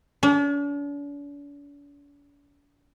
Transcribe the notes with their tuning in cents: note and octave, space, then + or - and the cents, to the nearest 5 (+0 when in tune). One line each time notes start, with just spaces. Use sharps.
D4 -45